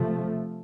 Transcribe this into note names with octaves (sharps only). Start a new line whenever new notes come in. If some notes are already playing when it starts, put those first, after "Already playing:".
Already playing: C3 F3 A3